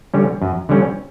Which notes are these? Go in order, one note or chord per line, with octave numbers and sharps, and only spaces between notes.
D3 G3 C#4
F#2
D3 G3 C#4